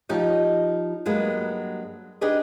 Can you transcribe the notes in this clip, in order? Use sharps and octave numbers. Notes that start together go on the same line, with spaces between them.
F3 D#4 G4 C#5 D#5
G2 F#3 G#3 A#3 B3 B4
D4 D#4 G4 G#4 B4 D#5